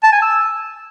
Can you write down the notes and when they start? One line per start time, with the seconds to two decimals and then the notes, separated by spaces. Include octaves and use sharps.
0.03 A5
0.12 G#5
0.22 E6